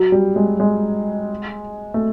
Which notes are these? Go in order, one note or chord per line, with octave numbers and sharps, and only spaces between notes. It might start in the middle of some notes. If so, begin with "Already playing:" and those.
Already playing: F#3
G3
G#3
G#3
A3